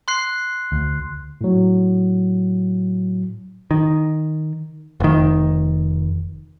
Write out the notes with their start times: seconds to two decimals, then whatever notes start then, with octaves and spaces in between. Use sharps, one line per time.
0.08 C6 F#6 C7
0.72 D2
1.41 A2 F#3
3.71 D#3
5.00 F1 D#3